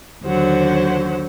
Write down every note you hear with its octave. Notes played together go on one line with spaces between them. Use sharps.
D#2 D3 F#3 C5 F#5